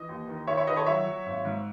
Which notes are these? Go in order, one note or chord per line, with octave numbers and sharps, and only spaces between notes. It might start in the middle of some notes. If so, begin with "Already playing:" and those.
Already playing: E3 D#5
D#2
D#3
D#3 C#5 E5
C#5 E5
D#3 B4 D#5
A4 C#5
F#3 C#5 E5
F#3
G#1
G#2